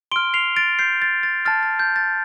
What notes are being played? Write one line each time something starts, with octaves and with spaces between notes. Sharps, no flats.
C6 F6 D7 G7
C7 F7
A6 D7
G6 C7
A6
A6
A5 F6 A6
A6
G6
A6